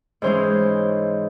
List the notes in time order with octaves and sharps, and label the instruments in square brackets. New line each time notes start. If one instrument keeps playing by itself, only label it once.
[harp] G#2 E3 G#3 C#4 C5